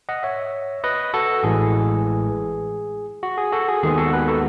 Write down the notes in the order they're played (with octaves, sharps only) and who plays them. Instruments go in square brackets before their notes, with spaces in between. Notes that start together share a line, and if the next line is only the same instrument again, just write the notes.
[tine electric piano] D#5 F#5
C#5 E5
B4 D#5
F#4 A4
A1 A2 E3 G#3 G#4
F#4
G#4
F#4 A4
G#4
D#2 D#3 G#3 B3 G#4
F#4 A4
G#4 B4
F#4 A4